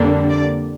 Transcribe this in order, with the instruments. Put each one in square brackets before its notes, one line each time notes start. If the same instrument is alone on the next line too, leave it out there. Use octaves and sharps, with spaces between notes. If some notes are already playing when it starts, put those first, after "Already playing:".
Already playing: [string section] F2 D3 G3 A#3 D4
D5